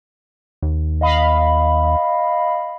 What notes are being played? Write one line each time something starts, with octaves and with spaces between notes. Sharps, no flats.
D#2
D#5 F5 B5